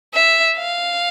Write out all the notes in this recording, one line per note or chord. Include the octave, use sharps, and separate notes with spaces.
E5
F5